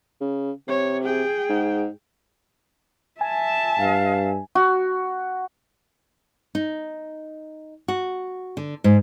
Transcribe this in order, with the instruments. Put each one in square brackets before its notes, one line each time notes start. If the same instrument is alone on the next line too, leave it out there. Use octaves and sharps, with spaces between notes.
[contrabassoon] C#3
[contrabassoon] C3 [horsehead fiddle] C#5
[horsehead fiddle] G#4 G5
[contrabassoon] G#2
[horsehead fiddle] E5 A5 [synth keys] G#5
[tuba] G2 [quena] F5
[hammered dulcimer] F#4
[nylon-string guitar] D#4
F#4
D3
G#2